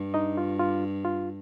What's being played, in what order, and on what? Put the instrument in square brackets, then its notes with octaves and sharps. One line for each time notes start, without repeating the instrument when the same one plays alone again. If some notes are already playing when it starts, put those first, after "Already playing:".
Already playing: [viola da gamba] G2
[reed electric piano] D#4 D#5
F4
F4
F4